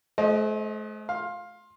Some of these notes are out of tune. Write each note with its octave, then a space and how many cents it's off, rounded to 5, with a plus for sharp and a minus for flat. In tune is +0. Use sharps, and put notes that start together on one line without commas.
A3 -45 C5 +0 D#5 +0
F5 +10 C6 +20